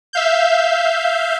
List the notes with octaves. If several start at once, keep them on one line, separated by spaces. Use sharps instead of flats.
E5 F5 G6